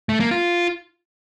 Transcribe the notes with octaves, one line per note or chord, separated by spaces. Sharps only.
A3
A#3
F4